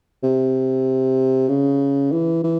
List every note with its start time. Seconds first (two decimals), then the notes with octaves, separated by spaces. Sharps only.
0.24 C3
1.49 C#3
2.12 E3
2.44 E3